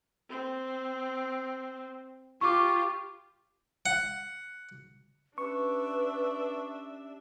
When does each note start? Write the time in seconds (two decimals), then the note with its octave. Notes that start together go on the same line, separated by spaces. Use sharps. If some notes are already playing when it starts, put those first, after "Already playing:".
0.30 C4
2.41 F4 G4 C#6 D6
3.86 F#5
5.38 C#4 D4 G4 B4 E5 C#6